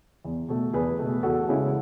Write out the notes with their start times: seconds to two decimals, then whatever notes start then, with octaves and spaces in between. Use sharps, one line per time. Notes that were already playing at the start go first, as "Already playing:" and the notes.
0.25 E2
0.49 B2 A3
0.73 E2 G#4 B4
0.99 B2 A3
1.23 E2 F#4 A4
1.48 C#3 G#3 C#4 E4